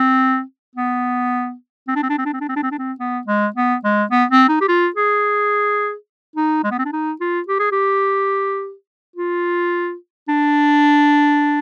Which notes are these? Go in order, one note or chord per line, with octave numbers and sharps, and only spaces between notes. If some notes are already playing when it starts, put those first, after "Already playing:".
Already playing: C4
B3
C4
D4
C4
D4
C4
D4
C4
D4
C4
D4
C4
D4
C4
B3
G#3
B3
G#3
B3
C4
D#4
G4
F4
G#4
D#4
G#3
B3
C4
D4
D#4
F4
G4
G#4
G4
F4
D4